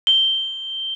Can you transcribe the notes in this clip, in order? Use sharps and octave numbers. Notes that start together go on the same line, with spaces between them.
G7